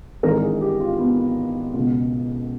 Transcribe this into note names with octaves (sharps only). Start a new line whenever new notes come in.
G#1 G#2 E3 A#4
G#4
G4
F4
B3
C#2 B2